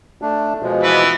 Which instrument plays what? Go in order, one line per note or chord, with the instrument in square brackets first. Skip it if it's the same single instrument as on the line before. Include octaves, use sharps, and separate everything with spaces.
[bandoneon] A3 D4
B2 F3 G#3
[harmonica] E3 B3 B4